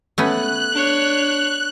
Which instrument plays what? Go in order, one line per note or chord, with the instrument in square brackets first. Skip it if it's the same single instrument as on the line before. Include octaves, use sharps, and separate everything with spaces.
[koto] A3 B3 C#4 [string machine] F#6
[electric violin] D4 C#5